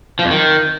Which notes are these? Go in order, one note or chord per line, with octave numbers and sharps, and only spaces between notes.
F3
F2
D#3